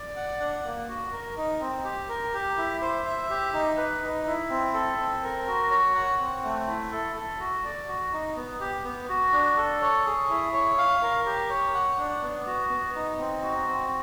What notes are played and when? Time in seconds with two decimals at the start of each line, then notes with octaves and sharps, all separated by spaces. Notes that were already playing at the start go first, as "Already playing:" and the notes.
Already playing: D5
0.16 F#5
0.40 D4
0.65 A#3
0.88 F#4
1.12 A#4
1.37 D#4
1.61 C4
1.84 G4
2.09 A#4
2.33 G4
2.57 E4
2.82 C5
3.06 E5
3.30 G4
3.54 D#4
3.77 B4
4.02 D#4
4.26 E4
4.50 C4
4.74 A4
4.98 C4
5.23 A#4
5.47 F#4
5.70 C#5
5.94 F#5
6.20 C4
6.44 A3
6.67 E4
6.92 A4
7.16 A4
7.40 F#4
7.64 D5
7.89 F#4
8.13 D#4
8.36 B3
8.60 G4
8.84 B3
9.09 F#4
9.33 D4
9.57 A4
9.81 C#5
10.05 G#4
10.29 E4
10.53 C#5
10.78 F5
11.02 A#4
11.26 G4
11.50 C#5
11.74 F#5
11.98 D4
12.22 B3
12.47 F#4
12.70 B3
12.95 D#4
13.19 C4
13.42 F#4
13.67 C4